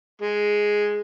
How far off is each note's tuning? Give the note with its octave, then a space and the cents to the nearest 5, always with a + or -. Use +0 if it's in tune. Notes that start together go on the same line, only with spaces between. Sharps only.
G#3 +0